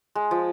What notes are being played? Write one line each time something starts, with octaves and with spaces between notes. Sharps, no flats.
G#3
F3